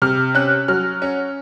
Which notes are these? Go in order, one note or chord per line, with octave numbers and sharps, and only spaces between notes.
C3 F6
C#4 F#6
F#3 F6
C#4